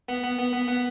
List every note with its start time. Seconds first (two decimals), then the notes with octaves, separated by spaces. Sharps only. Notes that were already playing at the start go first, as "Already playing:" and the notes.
0.09 B3
0.24 B3
0.39 B3
0.53 B3
0.68 B3